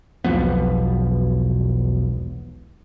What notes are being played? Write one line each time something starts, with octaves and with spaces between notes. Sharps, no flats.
E1 B1 F3 B3